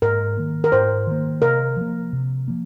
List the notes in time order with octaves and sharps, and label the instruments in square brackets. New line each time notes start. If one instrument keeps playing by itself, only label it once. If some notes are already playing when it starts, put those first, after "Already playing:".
[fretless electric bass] G#2 [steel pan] A#4
[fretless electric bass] D#3 A#3
[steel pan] A#4
[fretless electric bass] G#2 [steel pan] C5
[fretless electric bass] D#3 A#3
[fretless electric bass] C3 [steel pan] A#4
[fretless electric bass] F3 A#3
C3
F3 A#3